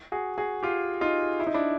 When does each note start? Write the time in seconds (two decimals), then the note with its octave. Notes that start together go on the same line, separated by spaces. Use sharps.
0.12 F#4 G#4
0.38 F#4 G#4
0.63 F4 G4
1.01 D#4 F4
1.40 E4
1.47 D#4
1.54 D4 E4